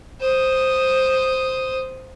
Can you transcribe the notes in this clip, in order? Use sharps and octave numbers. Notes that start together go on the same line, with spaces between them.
C5 D#6